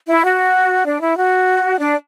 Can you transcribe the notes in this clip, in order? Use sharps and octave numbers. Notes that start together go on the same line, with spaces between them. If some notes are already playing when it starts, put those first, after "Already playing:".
E4
F#4
D4
E4
F#4
D4